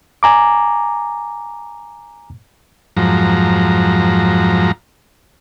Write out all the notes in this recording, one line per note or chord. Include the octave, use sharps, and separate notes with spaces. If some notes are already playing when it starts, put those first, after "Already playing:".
G#5 A#5 D6
F2 G#2 F3 F#3 A#5